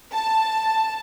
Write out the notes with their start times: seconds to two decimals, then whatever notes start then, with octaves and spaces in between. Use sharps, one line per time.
0.13 A5